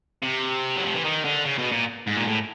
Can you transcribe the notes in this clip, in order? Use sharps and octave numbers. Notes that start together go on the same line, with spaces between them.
C3
F#3
F3
E3
D#3
D3
C#3
B2
A#2
G#2
A#2
A2